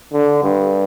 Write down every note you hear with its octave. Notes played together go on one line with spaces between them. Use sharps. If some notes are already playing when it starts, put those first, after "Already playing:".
D3
G2